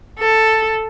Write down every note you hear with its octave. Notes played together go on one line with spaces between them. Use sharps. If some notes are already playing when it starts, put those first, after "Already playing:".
A4